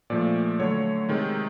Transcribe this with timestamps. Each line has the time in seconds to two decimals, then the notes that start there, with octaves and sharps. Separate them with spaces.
0.10 A#2 F3 A3 D5
0.59 D3 F#3 A3 C#5
1.09 C3 D#3 G#3